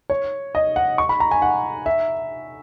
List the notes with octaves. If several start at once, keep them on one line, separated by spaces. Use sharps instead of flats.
C#5
D#5
F#5
C#6
B5
A#5
G#5
F#5
E5